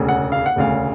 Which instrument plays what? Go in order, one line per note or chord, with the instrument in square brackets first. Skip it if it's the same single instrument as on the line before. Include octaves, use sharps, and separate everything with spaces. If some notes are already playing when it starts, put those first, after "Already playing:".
Already playing: [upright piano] E1 D2 C#3
F#5
F5
F#5
E1 D2 C#3 F5